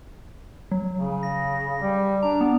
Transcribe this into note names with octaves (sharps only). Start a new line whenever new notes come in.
F#3
C#3
A#6
G3
D4 A#5
B3